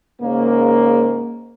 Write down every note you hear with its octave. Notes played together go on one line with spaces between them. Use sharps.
G#2 C#3 A#3